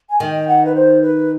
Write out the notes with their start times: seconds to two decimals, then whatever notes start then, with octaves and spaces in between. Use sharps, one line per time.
0.10 G#5
0.20 D#3 G5
0.48 F#5
0.65 B4
0.75 C5
1.02 B4